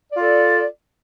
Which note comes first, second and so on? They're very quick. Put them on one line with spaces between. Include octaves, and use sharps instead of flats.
D5 F4 A4